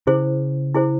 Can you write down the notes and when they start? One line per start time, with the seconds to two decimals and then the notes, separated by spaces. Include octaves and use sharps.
0.07 C#3 E4 G#4 C5
0.75 E4 G#4 C5